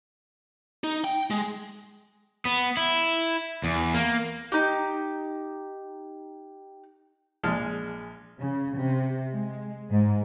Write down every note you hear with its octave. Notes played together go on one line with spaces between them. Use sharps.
D#4
G5
G#3
B3
E4
E2
A#3
D#4 G4
A#1 G#3 G#4 A5 F6
C#3
C3
G#3
G#2